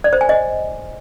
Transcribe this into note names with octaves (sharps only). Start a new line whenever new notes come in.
D5
C5
G#5
D#5